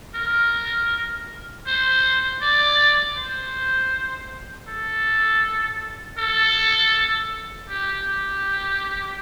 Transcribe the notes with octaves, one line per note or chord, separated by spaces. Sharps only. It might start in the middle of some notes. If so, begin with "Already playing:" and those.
A#4
C5
D5
C5
A4
A4
G4